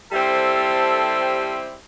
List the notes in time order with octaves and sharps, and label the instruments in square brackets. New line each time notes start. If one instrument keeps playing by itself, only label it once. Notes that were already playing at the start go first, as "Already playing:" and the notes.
[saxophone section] G3 C4 E4 G4 C5 [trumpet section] A4